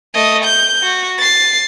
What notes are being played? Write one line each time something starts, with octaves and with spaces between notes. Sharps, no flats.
A3 D#5
G6
F#4
A6 C7